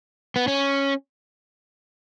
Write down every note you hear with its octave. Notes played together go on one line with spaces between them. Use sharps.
B3
C#4